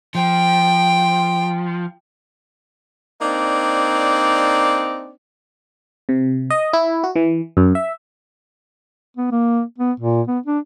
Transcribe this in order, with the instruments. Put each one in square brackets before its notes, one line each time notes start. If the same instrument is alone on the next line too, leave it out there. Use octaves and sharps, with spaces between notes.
[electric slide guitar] F3 [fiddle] G5
[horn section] A#3 C4 D4 D#4 D5
[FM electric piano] C3
D#5
E4
F#4
E3
F#2
E5
[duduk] B3
A#3
B3
A#2
B3
D4